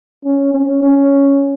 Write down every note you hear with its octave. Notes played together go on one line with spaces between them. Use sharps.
C#4
C#4
C#4